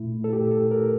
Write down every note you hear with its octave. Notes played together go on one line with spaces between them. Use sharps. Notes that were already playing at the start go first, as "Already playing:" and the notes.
Already playing: A#2 A3 E4
A4
G4
A4
A#4